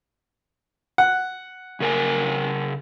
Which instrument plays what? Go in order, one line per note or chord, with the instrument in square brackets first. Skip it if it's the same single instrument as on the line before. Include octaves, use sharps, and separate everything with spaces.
[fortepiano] F#5
[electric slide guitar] C#3 A#4 G#5